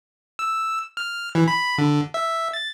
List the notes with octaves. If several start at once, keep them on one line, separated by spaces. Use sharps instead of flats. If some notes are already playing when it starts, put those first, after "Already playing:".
E6
F6
E3
B5
D3
E5
A6